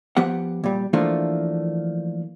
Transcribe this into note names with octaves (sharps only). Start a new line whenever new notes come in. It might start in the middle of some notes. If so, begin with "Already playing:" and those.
F3 B3 G4 F#5
A#2 G3
E3 F3 A3 A#3 D4 F4